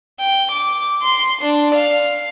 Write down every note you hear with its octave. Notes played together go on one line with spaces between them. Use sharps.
G5
D6
C6
D4
F5